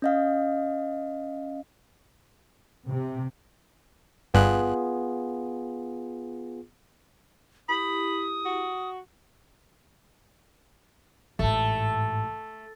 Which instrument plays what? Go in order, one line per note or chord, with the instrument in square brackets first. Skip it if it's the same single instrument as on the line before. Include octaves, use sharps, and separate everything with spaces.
[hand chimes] C#4 D#5 F5
[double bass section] C3
[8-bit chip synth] G1 G2 F#6 [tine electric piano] B3 F4 G#4
[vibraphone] E4 G4 [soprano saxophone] B5 [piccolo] D#6
[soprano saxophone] F#4
[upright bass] A1 G#2 [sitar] A3